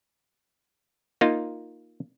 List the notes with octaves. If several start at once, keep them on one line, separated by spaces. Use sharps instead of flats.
A#3 D#4 F4